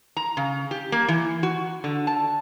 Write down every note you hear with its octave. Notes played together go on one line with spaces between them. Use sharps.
A#5
C#3
G4
A#3
E3
F#4
D3
A5